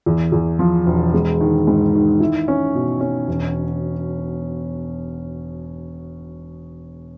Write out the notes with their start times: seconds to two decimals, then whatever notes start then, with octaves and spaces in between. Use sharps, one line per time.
0.06 E2
0.32 E2
0.59 F3
0.86 E1
1.14 G#3
1.41 D#3
1.67 G#2
1.94 D#3
2.20 E4
2.48 C#4
2.75 B2
3.00 C#4
3.28 E1